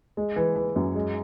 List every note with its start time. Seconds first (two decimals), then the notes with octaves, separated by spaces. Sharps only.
0.17 G#3
0.36 E3
0.56 E3
0.76 F#2
0.95 G#3